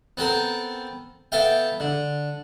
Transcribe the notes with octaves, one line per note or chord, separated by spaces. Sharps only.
B3 C4 A4 A#4
B3 A4 E5 F5 G5
D3